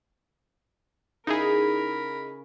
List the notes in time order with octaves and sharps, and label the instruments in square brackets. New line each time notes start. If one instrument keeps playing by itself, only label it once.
[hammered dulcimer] C#3 [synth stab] D#4 E4 G#4 [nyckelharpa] A#4 B5